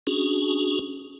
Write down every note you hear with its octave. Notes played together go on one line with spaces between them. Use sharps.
C#4 D4 F#4 G#4